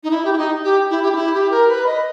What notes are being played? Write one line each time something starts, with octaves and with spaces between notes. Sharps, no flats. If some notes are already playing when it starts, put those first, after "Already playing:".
D#4
E4
G4
E4
D#4
G4
E4
G4
D#4
E4
G4
A#4
B4
D#5